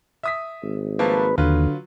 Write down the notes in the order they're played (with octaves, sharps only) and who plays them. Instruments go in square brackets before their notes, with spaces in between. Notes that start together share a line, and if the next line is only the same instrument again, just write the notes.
[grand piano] E5 D#6 B6
[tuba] G#1
[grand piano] F3 A3 A#3 [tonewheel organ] B4
[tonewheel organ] D#2 [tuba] D3 [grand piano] F#3 F4 B4